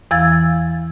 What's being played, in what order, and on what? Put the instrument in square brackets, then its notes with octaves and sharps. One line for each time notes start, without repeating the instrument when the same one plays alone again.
[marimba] E2 E3 F5 E6 G#6 A6